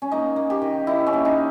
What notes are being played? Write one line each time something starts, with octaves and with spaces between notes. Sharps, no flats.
C#4
A#3 D#4
A#3
G4
D#3
D#3 E4
C#4
A#3
D#4